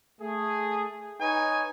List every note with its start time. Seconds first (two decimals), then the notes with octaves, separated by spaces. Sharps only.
0.20 A3 G#4
1.20 D#4 B4 C#5 G#5